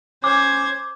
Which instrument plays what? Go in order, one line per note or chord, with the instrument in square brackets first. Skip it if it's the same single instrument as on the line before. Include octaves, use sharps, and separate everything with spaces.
[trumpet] C#4 [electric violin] C5 G#6 [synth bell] D6